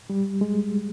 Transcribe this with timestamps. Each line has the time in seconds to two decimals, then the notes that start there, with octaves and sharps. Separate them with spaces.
0.10 G3
0.41 G#3